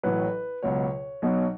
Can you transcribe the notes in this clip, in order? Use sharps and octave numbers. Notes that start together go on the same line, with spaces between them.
A1 A2 F#3 B4
C#2 B2 F#3 C#5
B1 B2 F#3